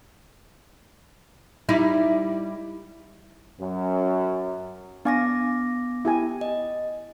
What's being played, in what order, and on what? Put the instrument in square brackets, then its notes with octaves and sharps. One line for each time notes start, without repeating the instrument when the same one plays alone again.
[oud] G3 D#4 E4
[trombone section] F#2
[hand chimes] B3 D6 A#6 [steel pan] D4 F5 G#5
[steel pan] E4 G4 G#5
[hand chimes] D#5